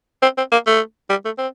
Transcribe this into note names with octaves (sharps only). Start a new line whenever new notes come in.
C4
C4
A#3
A3
G3
A3
C4